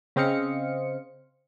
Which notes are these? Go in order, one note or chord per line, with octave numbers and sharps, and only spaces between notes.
C#3 C4 C5 D#5 F5 C#7